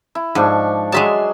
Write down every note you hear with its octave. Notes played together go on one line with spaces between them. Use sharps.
E4
G#2 F3 D4 C#6
F#3 G#3 G#4 E5 A5 C6